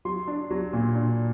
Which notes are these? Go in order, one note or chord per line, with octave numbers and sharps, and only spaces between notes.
F#3 C6
D4
F#3
A#2
D4